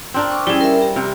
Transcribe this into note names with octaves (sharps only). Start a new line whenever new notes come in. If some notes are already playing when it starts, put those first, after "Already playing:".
C4 D4 A#4
C#6 D6
G3 C#4 E4 G#4
A#4 E5
G4
C3 A#4